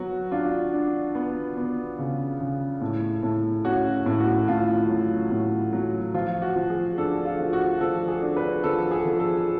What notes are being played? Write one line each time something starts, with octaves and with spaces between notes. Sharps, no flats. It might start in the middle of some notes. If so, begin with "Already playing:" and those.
Already playing: F#3 B3 F#4
D4 F4
D4
B3
B3
C#3
C#3
A2
A2
C#4 F#4
A2
F#4
A2 F4
F#3
A2
F#3
F3 F4
F#4
F3
G#4
D4 A4
F4
F3
F#4
F3 A4
G#4
D4
B4
F3 A4
G#4
F3
A4